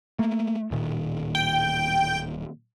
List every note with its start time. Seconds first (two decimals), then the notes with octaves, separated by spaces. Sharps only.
0.19 A3 A#3
0.71 D1 A#2 D#3
1.35 G5